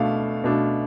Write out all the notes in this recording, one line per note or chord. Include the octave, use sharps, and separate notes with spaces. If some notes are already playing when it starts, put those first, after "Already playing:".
Already playing: B2 A3 D4 F5
B2 A3 D4